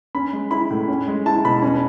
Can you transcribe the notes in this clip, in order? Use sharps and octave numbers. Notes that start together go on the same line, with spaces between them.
C#4 B5
G#3
E4 B5
A2
C#4
G#3
E4 A5
B2 B5
C#4